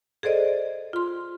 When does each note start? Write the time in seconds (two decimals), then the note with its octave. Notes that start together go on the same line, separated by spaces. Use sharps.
0.23 G#4 A4 C5 D5 D#5
0.93 F4 C6